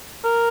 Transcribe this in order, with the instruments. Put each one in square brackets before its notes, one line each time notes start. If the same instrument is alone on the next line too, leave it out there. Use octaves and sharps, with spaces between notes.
[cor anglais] A#4